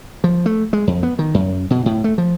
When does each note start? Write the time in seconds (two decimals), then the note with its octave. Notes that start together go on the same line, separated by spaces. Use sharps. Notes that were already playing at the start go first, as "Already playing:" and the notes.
0.24 F3
0.46 A3
0.73 G#3
0.87 F2
1.03 B3
1.19 D#3
1.34 F#2
1.70 B2
1.86 A2
2.04 A3
2.18 F3